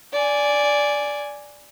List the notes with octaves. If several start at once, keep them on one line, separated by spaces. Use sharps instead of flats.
D5 G#5